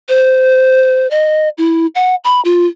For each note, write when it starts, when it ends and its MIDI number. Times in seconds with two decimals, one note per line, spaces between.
0.09 1.09 72
1.11 1.49 75
1.58 1.87 64
1.95 2.15 78
2.24 2.41 83
2.45 2.66 65